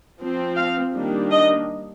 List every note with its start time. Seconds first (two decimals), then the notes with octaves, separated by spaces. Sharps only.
0.21 F3 C4
0.57 F5
0.94 D#3 G3 A#3 D4
1.31 D#5